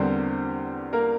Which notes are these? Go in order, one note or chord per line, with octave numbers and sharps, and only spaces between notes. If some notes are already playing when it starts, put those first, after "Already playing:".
Already playing: E2 D3 G3 A#3 C4 C5
A#3 A#4